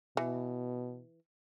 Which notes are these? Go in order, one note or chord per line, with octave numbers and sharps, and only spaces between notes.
B2 E3